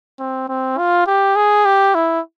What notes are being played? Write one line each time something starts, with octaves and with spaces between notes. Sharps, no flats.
C4
C4
F4
G4
G#4
G4
E4